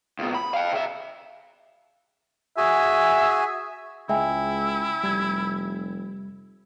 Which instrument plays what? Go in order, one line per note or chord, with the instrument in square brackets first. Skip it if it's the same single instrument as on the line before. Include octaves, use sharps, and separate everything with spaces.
[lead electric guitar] C#2 B2
B5
F5 G5
C#3 E5
[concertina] F#4 G#4 G#5 [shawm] E5
[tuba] C#2 [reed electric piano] G#3 [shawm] E4 [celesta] E5 G5 G#5
[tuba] F1 [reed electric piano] G3 G#6